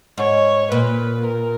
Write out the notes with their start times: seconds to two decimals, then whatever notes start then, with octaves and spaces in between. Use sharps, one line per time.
0.18 G#2 C#5
0.72 A#2 B4
1.26 A#4